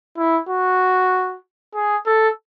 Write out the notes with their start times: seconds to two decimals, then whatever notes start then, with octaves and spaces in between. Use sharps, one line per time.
0.18 E4
0.49 F#4
1.75 G#4
2.06 A4